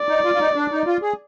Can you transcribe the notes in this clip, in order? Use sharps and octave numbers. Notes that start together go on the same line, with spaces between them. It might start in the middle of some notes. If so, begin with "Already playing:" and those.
Already playing: D5
D#4
F4
F4
D#4
D4
D#4
F4
G#4